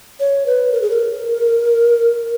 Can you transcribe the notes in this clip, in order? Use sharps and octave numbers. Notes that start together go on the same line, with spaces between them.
C#5
B4
A#4
G#4
A#4